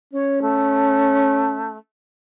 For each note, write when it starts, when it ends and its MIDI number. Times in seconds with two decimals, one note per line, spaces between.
0.13 1.76 61
0.13 0.39 73
0.42 1.77 57